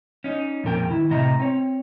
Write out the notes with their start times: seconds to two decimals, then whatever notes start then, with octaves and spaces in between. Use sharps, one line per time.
0.24 C#4 D#4
0.64 F2 A#2 A#4 G5
0.90 D#3 E4
1.10 A2 C3 D#5 E5 A#5
1.40 C4 C#5